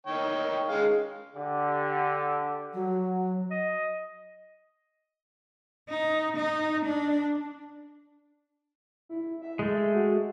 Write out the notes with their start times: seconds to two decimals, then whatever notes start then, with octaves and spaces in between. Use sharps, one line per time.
0.07 D#3 C#5 G5
0.69 G#3 F5
1.36 D3 G4
2.74 F#3
3.50 D#5
5.89 D#4
6.36 D#4
6.85 D4
9.09 E4
9.42 E5
9.59 G#3 A3
9.94 F#4